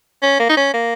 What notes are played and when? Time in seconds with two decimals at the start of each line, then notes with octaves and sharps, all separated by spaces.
0.22 C#4
0.40 A#3
0.49 D#4
0.57 C#4
0.74 A#3